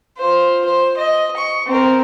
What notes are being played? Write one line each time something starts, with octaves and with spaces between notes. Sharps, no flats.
F4 C5
C5
D#5
C#6
C4 A#4